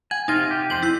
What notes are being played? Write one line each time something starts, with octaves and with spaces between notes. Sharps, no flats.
F#5 G#5
C3 D#4 F4 G5 D#7
G4
F2 C5 G5 F#7
E4 F#6